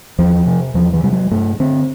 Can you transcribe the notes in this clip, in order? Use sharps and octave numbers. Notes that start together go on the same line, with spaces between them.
E2 F3
C3
E2 F3
E3
C3 G3
F#3
G2 A3
D3 C4